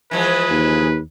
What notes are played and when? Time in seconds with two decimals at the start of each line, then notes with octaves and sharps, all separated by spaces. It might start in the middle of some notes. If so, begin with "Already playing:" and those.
0.11 E3 F3 G#3 B4
0.50 D#2